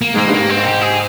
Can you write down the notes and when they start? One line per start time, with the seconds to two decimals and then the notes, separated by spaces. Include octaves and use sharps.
0.02 A#3
0.14 G#2 A#3
0.26 G2
0.34 G#2 A#3
0.50 C4
0.65 G4
0.81 G#4